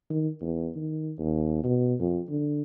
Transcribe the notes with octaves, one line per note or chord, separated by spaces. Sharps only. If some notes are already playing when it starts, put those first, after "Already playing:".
D#3
E2
D#3
D#2
B2
F2
D3